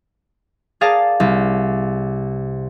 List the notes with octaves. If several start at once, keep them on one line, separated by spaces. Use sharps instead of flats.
G#4 A#4 D5 F5 A5
C2